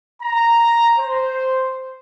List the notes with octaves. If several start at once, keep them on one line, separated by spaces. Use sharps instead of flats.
A#5
C5